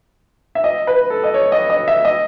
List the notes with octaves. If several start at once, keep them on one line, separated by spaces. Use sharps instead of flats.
E5
D#5
B4
A4
D#5
C#5
D#5
D#5
E5
D#5